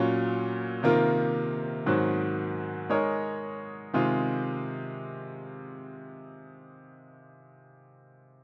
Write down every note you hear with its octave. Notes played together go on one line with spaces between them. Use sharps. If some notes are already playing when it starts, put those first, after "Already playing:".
Already playing: A#2 F#3 C#4 F4
C3 D#3 A#3 F4 A#4
G#2 D#3 F#3 C4
G#3 D#4 A#4 C#5
C3 D#3 G#3 C4 F4